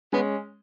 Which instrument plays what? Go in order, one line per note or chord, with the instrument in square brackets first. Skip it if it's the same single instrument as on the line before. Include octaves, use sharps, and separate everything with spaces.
[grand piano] G#3 C#4 [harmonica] B3